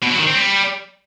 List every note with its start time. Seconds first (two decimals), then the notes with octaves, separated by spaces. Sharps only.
0.03 B2
0.11 F#3
0.19 D#3
0.27 C4
0.35 G3